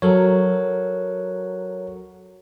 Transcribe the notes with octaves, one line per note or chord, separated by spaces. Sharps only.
F#3 A4 A#4 C#5